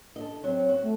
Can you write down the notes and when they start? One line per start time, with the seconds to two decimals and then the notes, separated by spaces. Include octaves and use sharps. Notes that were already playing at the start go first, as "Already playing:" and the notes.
0.16 D4 A4 D#5
0.44 F#3 C4
0.69 F#4
0.82 A3